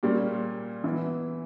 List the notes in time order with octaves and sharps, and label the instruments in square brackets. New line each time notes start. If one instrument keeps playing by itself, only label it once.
[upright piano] A#2 G3 A#3 C#4
E3 B3 E4